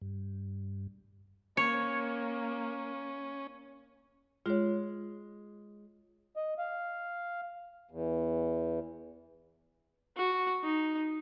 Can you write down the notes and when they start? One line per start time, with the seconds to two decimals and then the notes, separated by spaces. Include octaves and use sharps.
0.01 G2
1.57 A#3 C#4 C#5
4.46 G#3 F4 C#5
6.36 D#5
6.58 F5
7.91 E2
10.16 F#4
10.64 D#4